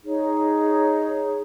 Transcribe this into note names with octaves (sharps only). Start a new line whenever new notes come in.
D#4 G#4 C#5